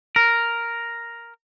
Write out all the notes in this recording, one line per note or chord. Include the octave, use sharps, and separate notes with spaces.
A#4